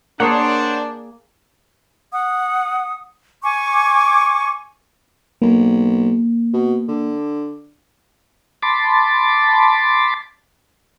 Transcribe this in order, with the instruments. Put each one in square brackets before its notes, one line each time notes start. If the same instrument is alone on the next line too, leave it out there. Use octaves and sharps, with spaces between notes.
[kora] A#3 G#4 [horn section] D4 [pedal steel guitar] C5 C#5 F#5
[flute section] F#5 D#6
G#5 C#6 D6
[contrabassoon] B1 [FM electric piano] A#3
[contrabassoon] B2
D3
[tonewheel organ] A5 B5 C6 D6 A6